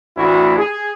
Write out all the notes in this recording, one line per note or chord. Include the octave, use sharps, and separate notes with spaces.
A1 D2 E4 F#4
G#4